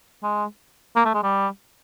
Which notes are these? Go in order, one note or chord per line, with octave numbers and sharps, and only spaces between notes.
G#3
A#3
A3
G#3
G3